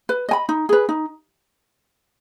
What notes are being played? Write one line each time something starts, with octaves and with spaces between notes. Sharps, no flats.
B4
D#5 G#5 B5
D#4
G#4 B4
D#4